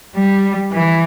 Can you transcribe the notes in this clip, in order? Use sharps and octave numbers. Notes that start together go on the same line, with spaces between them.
G3
E3